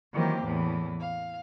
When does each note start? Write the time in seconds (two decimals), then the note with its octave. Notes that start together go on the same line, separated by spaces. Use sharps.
0.13 D#3 E3 F#3 A#3 C4 G4
0.43 E2 A2 E3
1.00 F5